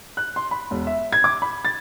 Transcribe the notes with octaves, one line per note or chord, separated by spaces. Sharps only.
F#6
C6
B5
E1
E5
G#6
D6
B5
A6